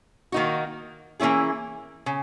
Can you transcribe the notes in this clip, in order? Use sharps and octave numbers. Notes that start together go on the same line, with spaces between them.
D#3 A#3 D#4 F#4
E3 A#3 C#4 E4 G#4
C#3